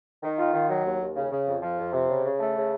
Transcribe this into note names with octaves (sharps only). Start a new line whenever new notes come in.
D#3
F4
D#3
F#3
D#2
D#2
C#3
C#3
F2
F3
F2
C3
C#3
C#3
A3
C#3